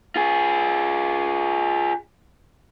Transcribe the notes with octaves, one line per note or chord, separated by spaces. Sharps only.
F4 G#4